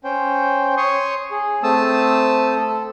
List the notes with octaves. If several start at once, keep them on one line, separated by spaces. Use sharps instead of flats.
C#4 C5 G5
C#5 C6 C#6 D#6
G#4
A3 C4 A5 D#6 E6
A4